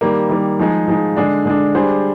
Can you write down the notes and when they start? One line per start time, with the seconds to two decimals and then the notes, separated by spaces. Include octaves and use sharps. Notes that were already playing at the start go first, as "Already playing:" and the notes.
0.01 D#3 G3 A#3
0.29 D#3 G3 A#3
0.59 F3 G#3 D#4 G#4
0.88 F3 G#3 D#4 G#4
1.17 D3 G#3 D4
1.45 D3 G#3 D4
1.75 G3 D4 G#4 C5